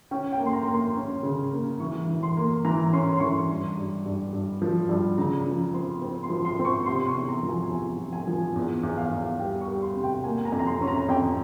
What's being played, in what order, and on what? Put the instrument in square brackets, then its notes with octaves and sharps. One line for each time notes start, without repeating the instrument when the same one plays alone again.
[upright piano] C#4 G5
G5
A#3
C6
A#5
A#3
C6
C#4
C#3
A#3
E3 C#6
E3
C6
A#3
E3 A#5
C#4 C6
C6
E3 C#6
G2
G2
G2
G2
F3
G2
C#3 A#5
F3
C4 C6
C4
C6
F3
C6
C4
C#6
C3 C6
C#6
E2
A#5
F3
G#5
E2 G#5
F3
G#5
F3
E2
E2
F5
E2
G3 G5
C#6
G3
C6
C3
G5
A#3 G#5
A#5
F2
A#5
C6
C#4
A#5
F2 G5